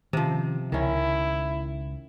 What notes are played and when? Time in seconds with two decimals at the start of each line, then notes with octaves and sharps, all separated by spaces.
0.13 C3 D#3 F3 C#4
0.72 C#2 D#3 C#4 E4